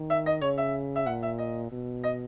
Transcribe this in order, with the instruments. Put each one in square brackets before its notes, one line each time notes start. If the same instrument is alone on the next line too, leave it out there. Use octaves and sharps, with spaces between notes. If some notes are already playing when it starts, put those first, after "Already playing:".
Already playing: [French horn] D#3
[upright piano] E5
D#5
[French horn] C#3 [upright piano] C#5
[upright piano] E5
E5
[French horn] A#2 [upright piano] F#5
[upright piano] E5
D#5
[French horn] B2
[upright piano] D#5